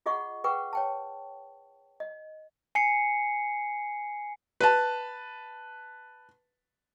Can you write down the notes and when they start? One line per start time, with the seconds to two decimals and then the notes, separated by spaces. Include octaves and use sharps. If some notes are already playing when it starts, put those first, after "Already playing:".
0.06 F4 G#4 D#5 F#5 C#6
0.44 G#4 B4 F#5 G5 C#6
0.73 C#5 G5 A5
2.00 D#5
2.75 G#5 C7 C#7
4.61 B4 A5